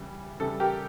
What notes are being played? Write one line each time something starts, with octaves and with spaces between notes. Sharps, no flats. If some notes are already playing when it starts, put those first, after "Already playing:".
Already playing: C#3 E3 G3
C#3 E3 G3 A4
G4 A#4